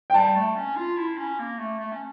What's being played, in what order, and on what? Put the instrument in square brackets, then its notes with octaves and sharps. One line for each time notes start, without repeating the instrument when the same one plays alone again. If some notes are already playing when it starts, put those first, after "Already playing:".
[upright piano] G5
[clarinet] G3 [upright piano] A5
[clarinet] A3
C#4
F4
E4
C#4
A#3
A3
A3
C#4